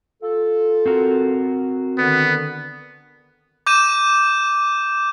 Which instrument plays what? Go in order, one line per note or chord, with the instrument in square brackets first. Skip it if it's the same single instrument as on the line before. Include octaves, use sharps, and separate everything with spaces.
[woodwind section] F4 A4
[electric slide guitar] C4 F#4 A#4
[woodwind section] D3 D#3 [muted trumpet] B3
[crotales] D6 G6 D#7 E7